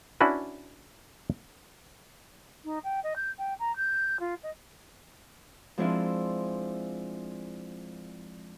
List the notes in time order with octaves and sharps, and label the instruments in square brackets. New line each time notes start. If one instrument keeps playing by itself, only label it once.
[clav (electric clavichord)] C#4 D4 E4 F#4 B4
[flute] D#4
G5
D#5
G6
G5
A#5
G6
F4
D#5
[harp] F3 G#3 C4 D4 E4 F4